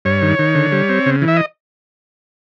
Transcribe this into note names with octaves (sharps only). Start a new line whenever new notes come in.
G2 C#5
D#3
D#3
D3
G3
C4
C#3
E3
E5
D#5